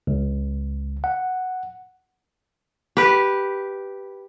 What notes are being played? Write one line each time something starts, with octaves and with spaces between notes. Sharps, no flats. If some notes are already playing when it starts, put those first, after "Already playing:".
C#2
F#5
G4 B4